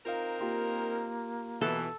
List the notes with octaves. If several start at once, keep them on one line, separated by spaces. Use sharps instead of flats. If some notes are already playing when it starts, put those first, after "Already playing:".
C4 D#4 F4 A#4 F5
A#3 F4 G4 C6
B2 E3 A4